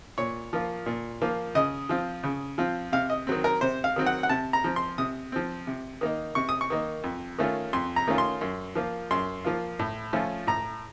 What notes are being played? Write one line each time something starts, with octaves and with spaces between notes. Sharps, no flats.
A#2 C#5
F3 A#3 F4
A#2
F3 A#3 F4
C#3 D#5
F3 C4 F4
C#3
F3 C4 F4
C3 F5
D#5
D#3 F#3 C4
A#4
C3 C5
F5
D#3 F#3 C4
F#5
F#5
C3 A5
A#5
F3 C4
C6
C3 D#6
F3 C4
C3
D#3 A#3 D#4
C3 C#6
D#6
C#6
D#3 A#3 D#4
F2
D#3 A3 C#4 F4
F2 C6
A#5
D#3 A3 C#4 F4
C6
F#2
F3 A#3 F4
F#2 C6
F3 A#3 F4
A2
F3 A3 C#4 F4
A2 A#5